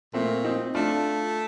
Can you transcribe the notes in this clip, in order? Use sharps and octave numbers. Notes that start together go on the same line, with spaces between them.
A#2 A3 C4
C4 D#4
A3 D4 F4